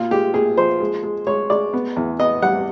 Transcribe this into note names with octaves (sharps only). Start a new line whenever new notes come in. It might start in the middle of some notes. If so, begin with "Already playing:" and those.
Already playing: A#2 F4
G#3 G4
A#2 G#4
F3 C5
G#3
G#3
G#3 C#5
G#3 D5
B3
E2
B3 D#5
G3 F#5